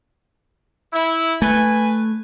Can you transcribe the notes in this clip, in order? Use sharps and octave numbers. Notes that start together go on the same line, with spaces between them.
E4
A3 B4 G#5